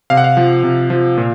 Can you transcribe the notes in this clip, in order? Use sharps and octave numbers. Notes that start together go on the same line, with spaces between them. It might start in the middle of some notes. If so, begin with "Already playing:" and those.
C3 F5
F#5
F5
F3
C3
F3
A#2